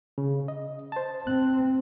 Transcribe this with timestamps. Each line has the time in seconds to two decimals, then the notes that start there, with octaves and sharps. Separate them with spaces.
0.18 C#3
0.48 D#5
0.92 C5 A5
1.27 C4 F#6